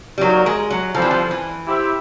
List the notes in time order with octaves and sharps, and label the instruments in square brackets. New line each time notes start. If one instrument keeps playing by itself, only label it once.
[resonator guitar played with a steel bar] G3
[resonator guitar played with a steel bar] F#3 [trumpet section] A#3 D#4 F#4 A#4
[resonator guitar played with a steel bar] G#3
F#3
[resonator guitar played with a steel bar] F3 [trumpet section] G3 C4 F4 A4 C5
[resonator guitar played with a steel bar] E3
F3
E3
[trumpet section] E4 G4 C5 E5